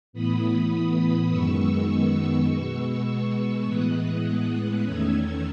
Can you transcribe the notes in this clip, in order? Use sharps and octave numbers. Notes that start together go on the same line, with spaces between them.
A2 E3 B3 B5 D#6
F#2 D#3 G#3 B3 C#6 E6
B2 G#3 B3 C#6 E6
A2 E3 G#3 B3 D#6 F#6
E2 D#3 A3 C#4 E6 G#6